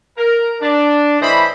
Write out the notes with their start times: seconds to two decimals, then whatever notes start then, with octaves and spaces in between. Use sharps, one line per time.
0.18 A#4
0.61 D4
1.21 A2 E3 C5 D#5 B5